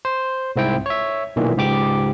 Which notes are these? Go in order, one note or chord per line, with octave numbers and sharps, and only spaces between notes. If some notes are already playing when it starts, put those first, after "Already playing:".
C5
C2 G#2 C4 E4 G5
C#5 E5
B1 A#2 D#3 E3
C#2 G#2 G4 D6